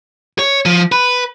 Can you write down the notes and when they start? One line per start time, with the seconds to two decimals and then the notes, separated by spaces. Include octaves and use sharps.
0.39 C#5
0.66 F3
0.92 B4